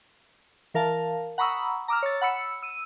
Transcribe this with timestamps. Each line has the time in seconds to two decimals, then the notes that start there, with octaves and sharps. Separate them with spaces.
0.74 E3 A#4 F5 A5
1.38 F#5 A#5 B5 C#6 D#6 E6
1.88 A#5 D6 E6 F6
2.03 C#5 A6
2.21 F#5 B5 E6 C#7
2.62 E6 D#7